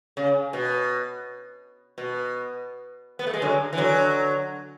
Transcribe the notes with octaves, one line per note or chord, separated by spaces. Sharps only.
C#3
B2
B2
B3
A3
G#3
D3 F#3
E3
D3 F#3